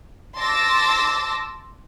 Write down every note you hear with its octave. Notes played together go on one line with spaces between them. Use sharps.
A5 C6 D6 E6 A6 A#6